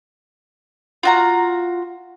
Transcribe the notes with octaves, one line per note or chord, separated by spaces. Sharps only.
F4 F#4 A#5